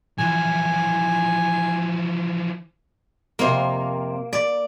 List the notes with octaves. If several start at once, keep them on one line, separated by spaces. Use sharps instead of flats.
E3 F3 G#5
F2 C3 A#3
D5